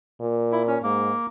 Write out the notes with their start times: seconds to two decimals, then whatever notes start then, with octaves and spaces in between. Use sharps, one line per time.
0.20 A#2
0.52 E4
0.67 C#4
0.83 G#2 A#3